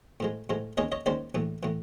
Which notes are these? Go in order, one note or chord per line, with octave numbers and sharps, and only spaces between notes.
A2 F3 G#3
A2 F3 G#3
D#2 D#3 G#3 C#4 C#5 D#5
C#5 D#5
D#2 D#3 G#3 C#4 C5 D5
A#1 A2 E3
A2 E3